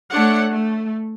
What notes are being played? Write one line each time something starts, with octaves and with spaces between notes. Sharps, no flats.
A3 D4 C#5 F#5
A3